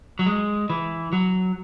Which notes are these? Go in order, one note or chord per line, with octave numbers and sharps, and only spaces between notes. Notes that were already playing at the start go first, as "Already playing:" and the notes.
F#3
G#3
E3
F#3